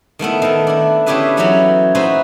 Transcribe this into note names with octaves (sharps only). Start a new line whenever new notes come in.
D#3 A3 B3 E4
D#3 A4
D4 E4
D3 C#4 E4 G4 G#4 B4
E3 F#3 C#4 D#4 E4 C#5
D#4 E4 F#4 B4 C5